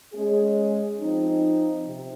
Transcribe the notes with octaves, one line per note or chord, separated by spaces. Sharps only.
G#3 C#4 G#4
F3 C4 D#4
C3